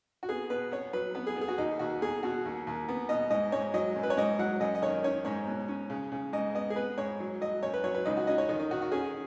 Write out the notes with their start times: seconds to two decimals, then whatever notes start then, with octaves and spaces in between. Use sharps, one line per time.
0.23 F#4
0.29 B3 G#4
0.50 B2 B4
0.72 B3 C#5
0.93 F#3 B4
1.15 B3 B4
1.27 G#4
1.36 B3
1.41 G#4
1.48 F#4
1.58 D#2 D#4
1.79 D#2 F#4
2.01 B2 G#4
2.23 B2 F#4
2.45 D#2
2.67 D#2
2.88 B3
3.09 B2 D#5
3.30 G#2 D#5
3.52 G#2 C#5
3.74 F#3 D#5
3.96 F#2
4.03 B4
4.10 C#5
4.17 G#2 D#5
4.39 F#3 F#5
4.60 F#2 D#5
4.75 D#5
4.82 D#3 C#5
5.04 C#4 C#5
5.25 G#2 C#5
5.47 B2
5.68 C#4
5.90 C#3
6.12 C#3
6.33 G#2 D#5
6.55 B3 D#5
6.70 G#4
6.76 B3 B4
6.98 G#2 C#5
7.20 F#3
7.41 F#3 D#5
7.63 F#2 C#5
7.74 B4
7.84 F#3 C#5
7.94 B4
8.05 C#2 D#4
8.17 F#4
8.27 C#4 D#5
8.38 C#5
8.49 D#3 D#4
8.60 D#4
8.71 D#3 F#4
8.82 F#4
8.92 C#4 G#4